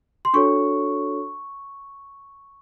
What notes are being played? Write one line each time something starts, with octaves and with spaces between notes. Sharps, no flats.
C6
D4 F#4 A4 C#5 C#6